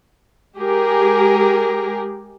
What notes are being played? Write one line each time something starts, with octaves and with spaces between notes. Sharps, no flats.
G#3 G4 G#4 A#4